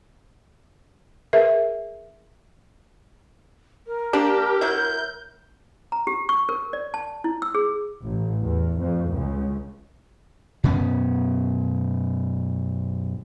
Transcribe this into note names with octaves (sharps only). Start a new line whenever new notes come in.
G#4 A#4 B4 E5
A#4
A#3 D4 G4
F#3 E4 G6
A#5
G4
C#6
A#4
D5
A5
E4
E6
G#4
A1
E2
F2
C#2
F#2 B2 B3 C#4